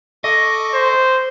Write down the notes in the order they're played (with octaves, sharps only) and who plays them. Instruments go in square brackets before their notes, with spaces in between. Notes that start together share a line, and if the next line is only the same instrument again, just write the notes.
[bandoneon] A4 C#6 D6 [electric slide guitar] D#5
[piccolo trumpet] C5